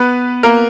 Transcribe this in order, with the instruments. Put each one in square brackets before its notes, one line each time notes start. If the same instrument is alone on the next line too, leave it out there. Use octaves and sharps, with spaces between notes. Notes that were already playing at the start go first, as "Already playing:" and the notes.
Already playing: [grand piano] B3 B4
A#3 A#4